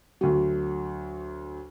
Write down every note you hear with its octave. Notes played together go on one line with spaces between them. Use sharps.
D2 F#3